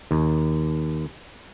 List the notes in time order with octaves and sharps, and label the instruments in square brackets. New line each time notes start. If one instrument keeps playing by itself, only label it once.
[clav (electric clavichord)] D#2